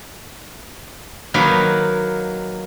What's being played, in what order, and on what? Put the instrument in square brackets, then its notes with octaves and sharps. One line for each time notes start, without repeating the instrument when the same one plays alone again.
[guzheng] D#3 F#3 A#3 B4